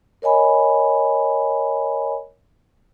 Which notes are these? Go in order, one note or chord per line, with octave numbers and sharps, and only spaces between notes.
A#4 C#5 D#5 G#5 B5